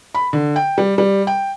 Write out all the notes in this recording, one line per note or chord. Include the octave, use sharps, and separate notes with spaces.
B5
D3
G5
G3
G3
G5